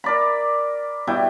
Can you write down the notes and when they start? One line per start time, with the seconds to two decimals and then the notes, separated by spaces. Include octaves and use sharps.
0.04 A#4 D5 B5
1.07 B2 G3 E4 G5